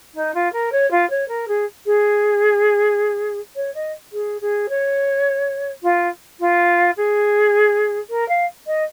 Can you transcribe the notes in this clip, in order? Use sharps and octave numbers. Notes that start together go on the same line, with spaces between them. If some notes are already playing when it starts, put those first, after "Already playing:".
D#4
F4
A#4
C#5
F4
C#5
A#4
G#4
G#4
C#5
D#5
G#4
G#4
C#5
F4
F4
G#4
A#4
F5
D#5